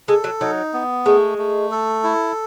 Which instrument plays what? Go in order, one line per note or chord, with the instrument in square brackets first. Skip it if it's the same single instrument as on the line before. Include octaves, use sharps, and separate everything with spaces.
[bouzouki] G#3 [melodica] A4
[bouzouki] F#3
[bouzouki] F#3 [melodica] D#4
[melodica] B3
[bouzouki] G#3 [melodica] A3
[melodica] A3
A4
E4